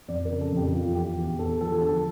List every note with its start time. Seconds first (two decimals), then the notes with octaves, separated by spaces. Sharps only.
0.08 F2 D5
0.25 A#4
0.31 C#3
0.41 A4
0.52 F2 G4
0.74 E2 F4
0.95 E3 G4
1.17 E2
1.39 E2 A4
1.61 F3 A4
1.82 D3 A4